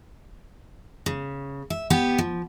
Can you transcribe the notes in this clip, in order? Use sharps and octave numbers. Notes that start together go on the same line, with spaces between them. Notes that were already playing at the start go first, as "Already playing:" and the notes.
C#3
E5
B3 G4
F3